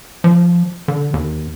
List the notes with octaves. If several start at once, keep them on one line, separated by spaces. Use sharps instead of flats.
F3
D3
D#2